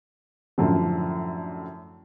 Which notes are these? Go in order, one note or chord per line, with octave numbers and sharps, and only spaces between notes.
F#2 A2 D3 F3